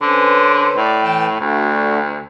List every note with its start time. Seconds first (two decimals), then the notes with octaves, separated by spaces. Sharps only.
0.02 D3 C#4 B4 C5
0.77 A2 D5
1.03 E3 G5 A5
1.40 D2 A3 D4 F#4